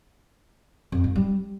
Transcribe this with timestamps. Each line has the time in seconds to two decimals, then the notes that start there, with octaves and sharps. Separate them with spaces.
0.92 F2
1.04 G#2
1.16 G3